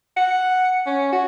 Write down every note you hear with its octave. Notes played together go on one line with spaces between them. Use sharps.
F#5
C#4
F#4